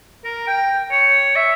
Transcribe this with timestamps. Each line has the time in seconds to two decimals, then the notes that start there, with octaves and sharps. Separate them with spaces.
0.24 A#4
0.47 G5
0.91 C#5
1.36 E5